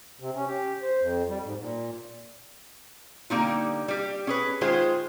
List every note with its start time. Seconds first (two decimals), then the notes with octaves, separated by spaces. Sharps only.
0.20 C3
0.35 C#4
0.48 G4
0.82 C5
1.01 F2
1.28 G3
1.43 G#2
1.60 A#2
3.30 D3 G3 A#3 D#4 F4
3.88 G3 G4
4.27 C#4 G#4 B4
4.61 D#3 G#3 F4 G#4 C5